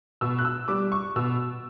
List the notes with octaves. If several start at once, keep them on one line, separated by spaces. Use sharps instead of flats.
B2 E6
F#6
E6
G3 D6
C#6
B2 E6